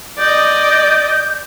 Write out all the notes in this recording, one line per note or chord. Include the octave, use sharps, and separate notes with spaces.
D5 D#5 G6